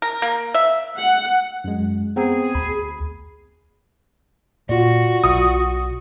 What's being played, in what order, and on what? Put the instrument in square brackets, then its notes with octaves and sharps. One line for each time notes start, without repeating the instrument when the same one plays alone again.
[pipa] A#4
A#3
E5
[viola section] F#5
[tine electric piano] F#2 G#3
[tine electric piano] B3 C4 A#5 [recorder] G#4
[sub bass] D2 [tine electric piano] B5
[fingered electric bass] A#2 [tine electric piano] F4 D5 [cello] F#4
[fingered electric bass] B1 [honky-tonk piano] D#6